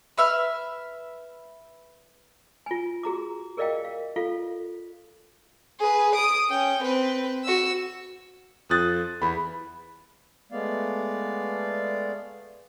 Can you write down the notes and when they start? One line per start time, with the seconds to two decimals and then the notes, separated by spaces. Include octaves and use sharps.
0.18 B4 E5 F6
2.66 F4 G#5
3.03 F#4 G#4 A#5 D6
3.57 G#4 A#4 D5 D#5 F5 G5
3.85 F5
4.16 F4 A4 F5
5.79 G#4 B4
6.15 D#6 D7
6.49 C#4 G5
6.82 C4 B4
7.44 F#4 E6
8.70 F2 D#6 F#6 A6
9.22 E2 B5
10.52 G#3 A3 B3 D5 F5